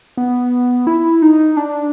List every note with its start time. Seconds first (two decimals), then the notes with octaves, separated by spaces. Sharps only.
0.17 B3
0.87 E4
1.22 D#4
1.57 D4